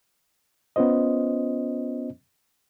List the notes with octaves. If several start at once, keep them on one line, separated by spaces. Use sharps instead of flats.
B3 C#4 F4 C5 D#5